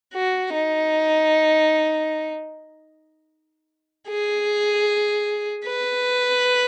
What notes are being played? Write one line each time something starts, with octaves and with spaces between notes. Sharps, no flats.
F#4
D#4
G#4
B4